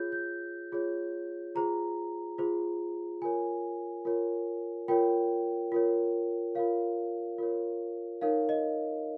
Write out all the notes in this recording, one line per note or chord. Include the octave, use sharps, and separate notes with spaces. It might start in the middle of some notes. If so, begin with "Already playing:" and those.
Already playing: F4 G#4 C#5 G6
G6
F4 G#4 C#5
F4 G#4 C5 A#5
F4 G#4 C5
F4 A#4 C#5 G#5
F4 A#4 C#5
F4 A#4 C#5 G5
F4 A#4 C#5
F4 A#4 C#5 F5
F4 A#4 C#5
D#4 A#4 C#5 F5
D#5